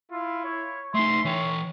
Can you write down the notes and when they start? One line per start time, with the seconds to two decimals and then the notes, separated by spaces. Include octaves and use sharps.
0.12 E4 F4
0.45 C#5
0.95 A3 D#4 E5 C6
1.25 E3 C#5 G5